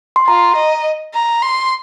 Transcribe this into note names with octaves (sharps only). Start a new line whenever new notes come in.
C6
F4 A#5
D#5
A#5
C6